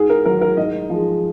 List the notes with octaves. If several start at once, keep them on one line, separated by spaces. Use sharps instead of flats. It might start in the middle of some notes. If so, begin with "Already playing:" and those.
Already playing: G#2 G#4
A#4
D#3 F#3 A#4
A#4
G#2 D#5
F3 G#3